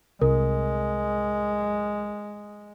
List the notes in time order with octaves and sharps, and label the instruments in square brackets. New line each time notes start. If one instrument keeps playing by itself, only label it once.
[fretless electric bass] C2 [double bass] G#3 [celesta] A#4